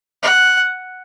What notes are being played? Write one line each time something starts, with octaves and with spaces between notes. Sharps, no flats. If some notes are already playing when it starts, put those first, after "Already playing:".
F#5